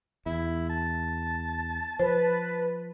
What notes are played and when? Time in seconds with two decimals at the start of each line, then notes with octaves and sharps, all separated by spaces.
0.26 E2 E4
0.70 A5
1.99 F3 B4 C5